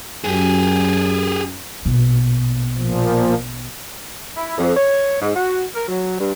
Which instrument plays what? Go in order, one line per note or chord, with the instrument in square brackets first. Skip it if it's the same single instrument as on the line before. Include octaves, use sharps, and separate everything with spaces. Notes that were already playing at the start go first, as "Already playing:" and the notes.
[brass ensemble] F#2 [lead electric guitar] G4 G#4
[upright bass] A#1 B2
[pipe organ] A#2 F3
[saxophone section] E4
F2
C#5
G#2
F#4
A#4
F#3
G2